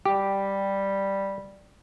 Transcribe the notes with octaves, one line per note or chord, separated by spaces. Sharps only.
G3 G4